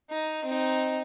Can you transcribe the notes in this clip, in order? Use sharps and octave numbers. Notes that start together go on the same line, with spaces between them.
D#4
C4 D#4